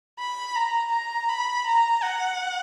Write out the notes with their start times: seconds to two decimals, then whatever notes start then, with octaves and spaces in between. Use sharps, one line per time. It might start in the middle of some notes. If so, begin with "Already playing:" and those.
0.19 B5
0.56 A#5
0.92 A#5
1.29 B5
1.67 A#5
2.03 F#5